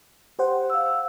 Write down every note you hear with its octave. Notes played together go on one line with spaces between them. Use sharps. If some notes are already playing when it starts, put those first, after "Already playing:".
G4 C5 F#5
F5 E6